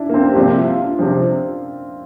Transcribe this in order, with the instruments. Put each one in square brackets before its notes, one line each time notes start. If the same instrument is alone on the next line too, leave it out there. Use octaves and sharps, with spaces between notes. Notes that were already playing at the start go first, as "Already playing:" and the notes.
Already playing: [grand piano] D4 E4
A#3
C4
G4
[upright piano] C2 C3 F3 [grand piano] F4
[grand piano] E4
F4
D4
[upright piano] C3 F3 [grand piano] C4